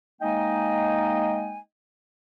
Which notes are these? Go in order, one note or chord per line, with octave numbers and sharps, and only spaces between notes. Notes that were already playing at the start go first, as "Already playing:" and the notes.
G#3 A#3 D#4 D#5 G5 G#5